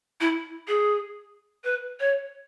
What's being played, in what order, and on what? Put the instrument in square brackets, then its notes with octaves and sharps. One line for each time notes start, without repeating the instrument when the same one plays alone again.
[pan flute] E4
G#4
B4
C#5